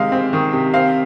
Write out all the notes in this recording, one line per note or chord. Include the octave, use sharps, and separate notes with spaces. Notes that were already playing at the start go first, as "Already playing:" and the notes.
Already playing: C3 D#3 G#3 F5
C4
D#3
C3
C4 F5